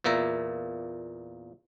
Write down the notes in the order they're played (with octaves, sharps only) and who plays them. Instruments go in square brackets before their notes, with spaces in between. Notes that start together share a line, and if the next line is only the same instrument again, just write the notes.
[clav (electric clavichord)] E2 A#2 A#3 E5 A#5